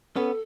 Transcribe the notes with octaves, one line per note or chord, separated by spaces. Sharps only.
B3 C#4 A4